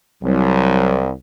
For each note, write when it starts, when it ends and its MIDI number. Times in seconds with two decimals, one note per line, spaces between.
0.23 1.12 36
0.23 1.02 54